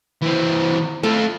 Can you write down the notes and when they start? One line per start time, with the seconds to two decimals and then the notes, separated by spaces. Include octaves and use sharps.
0.22 E3 C4
1.03 A3 F4 A4